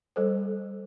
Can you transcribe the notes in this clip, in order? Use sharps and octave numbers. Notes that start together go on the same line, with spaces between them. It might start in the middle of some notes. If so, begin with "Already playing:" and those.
G3 A4 C5